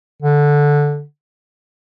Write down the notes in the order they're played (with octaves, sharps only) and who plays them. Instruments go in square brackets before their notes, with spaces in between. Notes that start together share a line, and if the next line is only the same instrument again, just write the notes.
[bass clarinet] D3